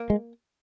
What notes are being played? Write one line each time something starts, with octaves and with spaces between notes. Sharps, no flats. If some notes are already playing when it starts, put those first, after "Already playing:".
Already playing: A#3
G#3